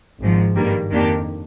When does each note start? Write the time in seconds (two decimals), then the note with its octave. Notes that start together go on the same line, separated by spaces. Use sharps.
0.20 G#1 G#2 F3
0.55 G2 D#3 G3 A#3
0.91 F2 D#3 A#3 D4 G4